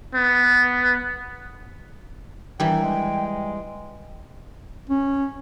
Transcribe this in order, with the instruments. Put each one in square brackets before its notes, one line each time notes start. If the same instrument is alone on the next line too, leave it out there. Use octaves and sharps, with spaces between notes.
[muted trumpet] B3
[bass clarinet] D#3 [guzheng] E3 G3 [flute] G5
[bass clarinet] G#3
C#4